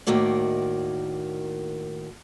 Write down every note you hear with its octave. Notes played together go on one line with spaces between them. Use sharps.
D#2 A2 D#3 A#3 F#4 D5